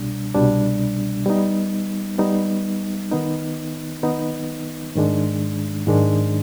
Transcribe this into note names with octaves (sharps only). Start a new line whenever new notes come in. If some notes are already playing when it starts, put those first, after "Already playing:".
Already playing: C2 B2 G3 D4
C2 B2 G3 D4
G3 B3 D#4
G3 B3 D#4
D#3 B3 D#4
D#3 B3 D#4
G#2 D#3 G#3 D4
G#2 D#3 G#3 D4